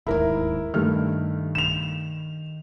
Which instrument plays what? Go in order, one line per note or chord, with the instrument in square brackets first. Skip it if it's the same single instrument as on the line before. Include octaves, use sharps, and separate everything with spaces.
[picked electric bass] D1 D#2 G#2 [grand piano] E4 A#4
[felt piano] G2 A3 F6 [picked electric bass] D#3
[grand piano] E7 F7